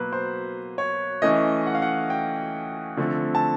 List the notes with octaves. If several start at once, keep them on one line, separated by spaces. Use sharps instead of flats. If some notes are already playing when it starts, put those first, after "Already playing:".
Already playing: B2 F#3 A#3 B4
C5
C#5
E3 A3 C#4 D#5
F#5
F5
F#5
G5
D3 F3 A3 C4
A5